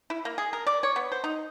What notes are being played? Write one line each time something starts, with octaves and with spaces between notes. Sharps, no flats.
E4
A#3
G#4
A#4
D5
C#5
B3
C5
D#4